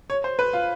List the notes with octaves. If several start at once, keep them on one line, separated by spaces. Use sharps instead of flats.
C#5
C5
B4
F4